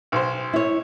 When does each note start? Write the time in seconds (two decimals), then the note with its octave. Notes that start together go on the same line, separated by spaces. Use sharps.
0.12 B1 C5
0.53 E4 C#5